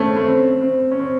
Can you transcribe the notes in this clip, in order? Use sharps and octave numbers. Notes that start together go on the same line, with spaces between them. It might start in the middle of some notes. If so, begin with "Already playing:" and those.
Already playing: A3 C4 C#4
A3
C4
C4
C#4
C4